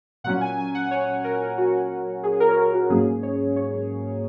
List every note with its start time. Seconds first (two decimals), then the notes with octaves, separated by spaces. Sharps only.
0.24 A#2 F#3 C#4 F#5
0.41 G#5
0.58 G#5
0.75 F#5
0.91 C#5
1.24 A#4
1.58 F#4
2.23 G#4
2.40 A#4
2.49 C#5
2.57 A#4
2.73 F#4
2.90 G#2 F#3 A#3 C#4 G#4
3.23 C#5
3.56 C#5